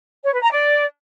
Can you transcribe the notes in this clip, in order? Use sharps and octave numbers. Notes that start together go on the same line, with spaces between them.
C#5
B4
A#5
D5